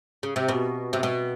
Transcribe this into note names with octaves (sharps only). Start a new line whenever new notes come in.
C#3
C3
B2
C3
B2